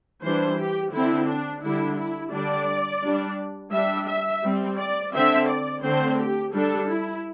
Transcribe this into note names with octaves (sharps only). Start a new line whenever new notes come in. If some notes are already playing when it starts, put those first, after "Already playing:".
E3 G3 D4 C5
G4
D3 C4 E4
D4
D3 G3 D4 E4
E4
D3 G3 D4 D5
G3 D4
G3 D4 E5
E5
G3 C4
D5
D3 C4 E5
D5
D3 A3 C4 C5
G4
G3 D4 A4
E4